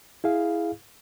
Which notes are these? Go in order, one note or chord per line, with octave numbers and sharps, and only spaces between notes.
E4 G#4 F5